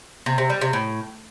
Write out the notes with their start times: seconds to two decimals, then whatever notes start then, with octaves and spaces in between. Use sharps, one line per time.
0.26 C3
0.38 C3
0.50 G3
0.61 C3
0.73 A2